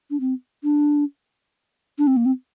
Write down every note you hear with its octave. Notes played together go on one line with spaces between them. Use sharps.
D4
C4
D4
D4
C4
A#3
C4